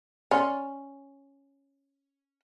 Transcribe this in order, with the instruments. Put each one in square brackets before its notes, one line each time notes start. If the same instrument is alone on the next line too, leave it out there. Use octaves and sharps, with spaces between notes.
[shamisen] C#4 [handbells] D5 C6 F6